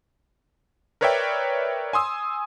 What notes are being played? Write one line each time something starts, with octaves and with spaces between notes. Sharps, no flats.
A#4 B4 C#5 D5 E5 G5
G#5 C6 D#6 E6